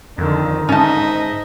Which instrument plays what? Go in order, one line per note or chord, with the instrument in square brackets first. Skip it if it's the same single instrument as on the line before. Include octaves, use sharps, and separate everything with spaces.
[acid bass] F2 [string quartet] D3 D#3
[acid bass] G#2 [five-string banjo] C#4 A5 [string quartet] D#4 D#5 E5